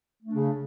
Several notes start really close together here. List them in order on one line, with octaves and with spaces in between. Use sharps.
A3 D4 C#3